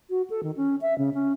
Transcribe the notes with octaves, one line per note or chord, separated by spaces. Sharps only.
F#4
A4
D#3
C#4
E5
C#3
C#4